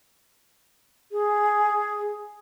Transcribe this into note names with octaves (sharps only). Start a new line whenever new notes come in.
G#4